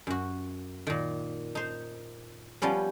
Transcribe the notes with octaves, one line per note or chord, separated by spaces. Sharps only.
F#2 F#4
A#2 D#3
D#4 C5
F3 G3 B3 C#4